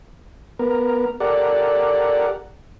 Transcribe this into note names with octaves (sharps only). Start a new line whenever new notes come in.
B3 A#4
G4 A4 A#4 D5 F#5